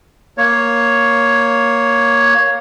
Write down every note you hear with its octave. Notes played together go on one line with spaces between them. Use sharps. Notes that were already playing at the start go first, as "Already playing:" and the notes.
A#3 C#5